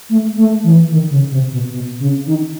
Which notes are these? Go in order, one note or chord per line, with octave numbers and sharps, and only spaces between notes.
A3
A3
E3
D#3
C#3
C3
B2
B2
C#3
D#3